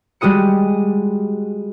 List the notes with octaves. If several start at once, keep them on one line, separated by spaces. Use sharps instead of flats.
G3 G#3 F#4 D#6 C#7